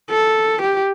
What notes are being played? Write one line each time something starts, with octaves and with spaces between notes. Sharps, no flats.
A4
G4